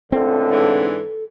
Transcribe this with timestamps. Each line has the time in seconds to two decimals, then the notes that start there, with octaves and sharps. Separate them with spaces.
0.12 C#2 A2 D3 C4 A4
0.51 G#2 E3 D4